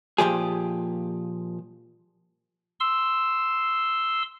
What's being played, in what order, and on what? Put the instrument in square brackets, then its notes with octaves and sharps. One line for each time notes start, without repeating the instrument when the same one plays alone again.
[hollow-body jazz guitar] A#2 F3 G4 G#4
[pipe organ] C6 E6